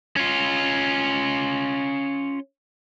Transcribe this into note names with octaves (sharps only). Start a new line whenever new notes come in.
C#4 F4